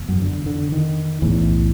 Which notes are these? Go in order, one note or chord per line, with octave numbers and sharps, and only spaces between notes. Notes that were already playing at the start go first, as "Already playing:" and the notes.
Already playing: F1 E2
F#2 F#3
D3
D3
D#3
B1 E2 A2 E3